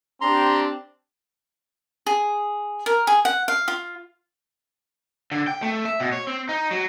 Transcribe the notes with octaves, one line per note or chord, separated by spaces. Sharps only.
C4 D4 G4 A#5 C6
G#4
A#4
G#4
F#5
F5
F4
D3
G5
A3
E5
B2
C#5
C4
D#4
F#3